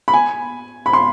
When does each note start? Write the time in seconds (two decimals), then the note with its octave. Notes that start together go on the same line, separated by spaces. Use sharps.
0.08 B5
0.13 G#5
0.86 B5
0.93 C6